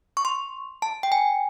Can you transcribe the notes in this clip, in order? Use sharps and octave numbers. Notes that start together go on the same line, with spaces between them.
C#6
C6
A5
G5
G#5